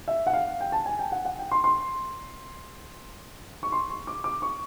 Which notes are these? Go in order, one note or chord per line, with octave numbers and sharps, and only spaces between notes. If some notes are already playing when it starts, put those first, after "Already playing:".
E5
F#5
F5
G5
A5
G#5
G5
F#5
F#5
G5
C6
C6
C#6
C6
C#6
D6
D6
C#6